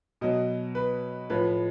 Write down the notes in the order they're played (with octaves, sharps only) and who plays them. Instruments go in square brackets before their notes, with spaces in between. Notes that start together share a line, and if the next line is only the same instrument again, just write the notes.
[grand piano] B2 F#3 D#5
B4
A2 F3 B4